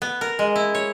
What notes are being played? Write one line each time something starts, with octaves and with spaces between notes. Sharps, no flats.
B3
A#4
G#3
E4
C#5